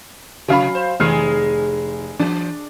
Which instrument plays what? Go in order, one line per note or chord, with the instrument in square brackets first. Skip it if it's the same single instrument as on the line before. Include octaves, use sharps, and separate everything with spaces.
[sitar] C3 [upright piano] F#3 F5 B5
[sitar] C5
[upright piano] F1 F6 C7 [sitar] D#3 G#3 G#4
[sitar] E3 [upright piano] D4